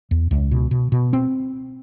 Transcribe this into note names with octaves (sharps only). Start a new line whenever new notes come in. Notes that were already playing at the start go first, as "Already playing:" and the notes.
E2
C#2
B2
B2
B2
C4